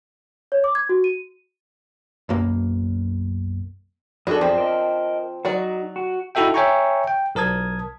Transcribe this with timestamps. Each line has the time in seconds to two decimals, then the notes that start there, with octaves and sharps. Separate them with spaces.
0.52 C#5
0.64 D6
0.75 G#6
0.89 F#4
1.04 D#7
2.29 B1 F#2 A#3
4.27 F2 D4 F#4 G#4 A4 D5
4.41 F3 C4
4.58 A#4 D#5
5.45 F#3 D#4 F#4 D5
5.96 F#4
6.35 D#4 E4 F#4 A4 E5 G5
6.54 C#5 E5 G5 G#5 A#5 C#6
7.07 G5
7.35 B1 A#4 A5 D#6 G#6